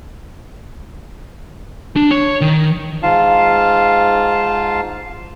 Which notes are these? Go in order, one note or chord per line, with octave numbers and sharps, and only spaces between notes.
D4
C#5
D#3
G#2 F4 F5 A5